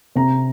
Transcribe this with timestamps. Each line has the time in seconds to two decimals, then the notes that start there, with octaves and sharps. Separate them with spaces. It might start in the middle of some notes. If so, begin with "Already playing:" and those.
0.16 C3 A#5